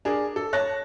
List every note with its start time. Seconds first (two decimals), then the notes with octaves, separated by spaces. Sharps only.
0.05 D4 G#4 A#4
0.36 A4
0.53 C#5 A5 F#6 A#6